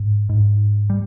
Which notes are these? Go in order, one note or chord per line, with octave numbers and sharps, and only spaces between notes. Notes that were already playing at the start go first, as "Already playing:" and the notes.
Already playing: G#2
G#2
G3